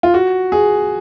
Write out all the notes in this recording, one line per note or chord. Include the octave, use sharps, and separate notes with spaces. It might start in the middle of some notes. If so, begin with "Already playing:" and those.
F4
F#4
G#4